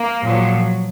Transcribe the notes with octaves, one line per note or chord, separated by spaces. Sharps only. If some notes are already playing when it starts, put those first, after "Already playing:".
Already playing: A#3
A#2 F3 F#3